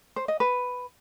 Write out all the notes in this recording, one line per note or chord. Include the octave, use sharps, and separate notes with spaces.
C5
D#5
B4